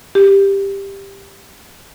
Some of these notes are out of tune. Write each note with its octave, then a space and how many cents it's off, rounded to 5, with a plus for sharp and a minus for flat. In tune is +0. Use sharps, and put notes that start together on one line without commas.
G4 +10